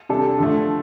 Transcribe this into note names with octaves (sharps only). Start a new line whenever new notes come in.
C3 G3 D4 A4
D3 F3 A3